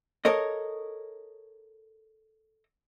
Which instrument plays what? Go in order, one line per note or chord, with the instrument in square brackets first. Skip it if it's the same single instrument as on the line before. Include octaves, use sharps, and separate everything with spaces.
[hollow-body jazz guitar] A4 A#4 C#5 D#5